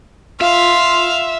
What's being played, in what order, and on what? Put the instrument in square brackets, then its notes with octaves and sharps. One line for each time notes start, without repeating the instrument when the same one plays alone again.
[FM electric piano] F4 [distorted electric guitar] E5 [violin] F5 [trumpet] C6